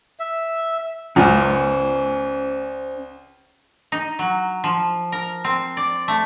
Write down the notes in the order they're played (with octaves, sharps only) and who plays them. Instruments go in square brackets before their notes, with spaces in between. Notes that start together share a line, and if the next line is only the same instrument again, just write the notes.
[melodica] E5
[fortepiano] C#2 [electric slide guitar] C#4 C5 D5
[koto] D#4
F#3
F3
A#4
C4
D5
A3